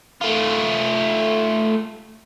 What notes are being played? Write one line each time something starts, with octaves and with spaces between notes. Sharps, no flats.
A3 F4